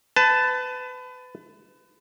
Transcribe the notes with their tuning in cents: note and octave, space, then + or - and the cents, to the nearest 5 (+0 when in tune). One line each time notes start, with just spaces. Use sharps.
B4 +30 A5 +0